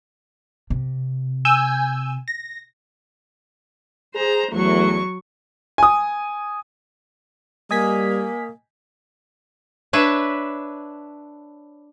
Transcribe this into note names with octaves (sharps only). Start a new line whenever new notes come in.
C3
G#5 E6 G6
A#6
G#4 C5 A#5
E2 F#3 A3 C#6
G#5 D#6
G3 A#3 D#5 G#5 D#6 B6
D4 B4 C#5 E5